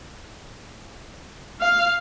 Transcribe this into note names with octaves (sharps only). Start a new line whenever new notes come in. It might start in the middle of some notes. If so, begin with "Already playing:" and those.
F5